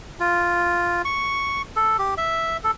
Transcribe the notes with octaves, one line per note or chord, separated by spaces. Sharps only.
F4
C#6
A4
G4
E5
A4